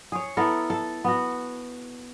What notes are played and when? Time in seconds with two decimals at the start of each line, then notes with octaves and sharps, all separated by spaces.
0.12 G#4 C#5
0.37 B3 E4 A4 A#4
0.70 A4
1.04 B3 F#4